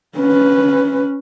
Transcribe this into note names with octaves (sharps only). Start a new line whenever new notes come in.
C#4 B4